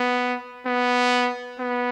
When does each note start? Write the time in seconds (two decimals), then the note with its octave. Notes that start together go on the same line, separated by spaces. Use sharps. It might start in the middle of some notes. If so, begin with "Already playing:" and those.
Already playing: B3
0.66 B3
1.59 B3